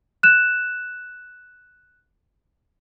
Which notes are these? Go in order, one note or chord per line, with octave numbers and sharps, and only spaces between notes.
F#6 E7